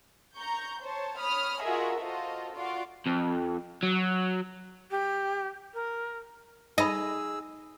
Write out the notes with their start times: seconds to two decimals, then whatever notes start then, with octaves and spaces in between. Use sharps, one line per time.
0.35 A#5 C#6 G6
0.82 C5 C#5 A5
1.20 C#5 B5 D#6 F6
1.63 F4 F#4 G#4 A#4 D#5 E5
2.00 F4 F#4 A4 C5 D#5
2.55 F4 F#4 D5 C6 D6
3.06 F2
3.83 F#3
4.91 G4
5.74 A#4
6.78 D#4 G#4 D#5 B5 E6